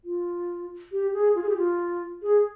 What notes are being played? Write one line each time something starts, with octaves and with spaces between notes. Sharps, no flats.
F4
G4
G#4
F4
G#4
G4
F4
G#4